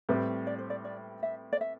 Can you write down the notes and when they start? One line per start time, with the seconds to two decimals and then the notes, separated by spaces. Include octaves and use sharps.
0.09 A2 G3 C4 G4 B4
0.47 D5
0.58 C5
0.70 D5
0.85 D5
1.23 E5
1.53 D5
1.61 E5